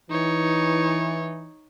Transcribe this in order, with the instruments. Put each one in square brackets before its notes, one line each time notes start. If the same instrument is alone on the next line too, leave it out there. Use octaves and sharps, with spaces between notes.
[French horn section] E3 [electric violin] D#4 C#5